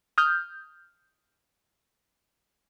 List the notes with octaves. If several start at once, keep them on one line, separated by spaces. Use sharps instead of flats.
D#6 F6 G6